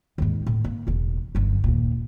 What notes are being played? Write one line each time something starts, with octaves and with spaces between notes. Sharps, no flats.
D#2 G#2
A2
A#3
E1 E2
G1 F#2
D#2 A#2